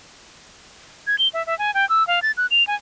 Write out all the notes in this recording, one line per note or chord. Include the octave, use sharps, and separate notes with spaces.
G#6
G7
E5
E5
G#5
G5
E6
F5
A6
F#6
F7
G#5